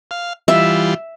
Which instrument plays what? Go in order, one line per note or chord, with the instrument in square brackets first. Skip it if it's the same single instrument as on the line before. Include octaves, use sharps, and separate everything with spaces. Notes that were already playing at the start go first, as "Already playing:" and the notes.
[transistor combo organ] F5
[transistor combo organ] E3 G3 F4 [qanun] E5